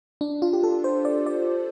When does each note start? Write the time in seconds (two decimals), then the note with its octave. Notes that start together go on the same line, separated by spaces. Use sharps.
0.21 D4
0.42 F4
0.53 G4
0.63 A4
0.84 C5
1.05 D5
1.26 D5